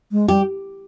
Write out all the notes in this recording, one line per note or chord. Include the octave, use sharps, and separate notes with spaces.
G#3
G3 G4